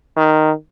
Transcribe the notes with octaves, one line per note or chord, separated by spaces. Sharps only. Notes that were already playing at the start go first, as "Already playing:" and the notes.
D#3